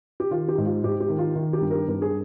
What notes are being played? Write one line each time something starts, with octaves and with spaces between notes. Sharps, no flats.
G4
D#3 F4
G4
G#2
F4
G#2 G4
G4
D#3
F4
D#3
G4
G2
G4 A#4
G2 A#4
G#4